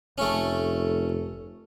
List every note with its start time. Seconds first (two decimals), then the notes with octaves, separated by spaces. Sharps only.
0.18 F1 A3 C#4